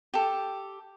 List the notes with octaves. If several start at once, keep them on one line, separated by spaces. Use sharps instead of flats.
G4 A4